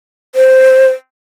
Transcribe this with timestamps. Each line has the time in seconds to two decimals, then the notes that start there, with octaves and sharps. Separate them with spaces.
0.35 C5